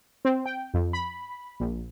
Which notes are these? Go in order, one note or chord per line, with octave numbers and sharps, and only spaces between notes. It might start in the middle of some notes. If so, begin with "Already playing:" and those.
C4
G5
F2
B5
A#1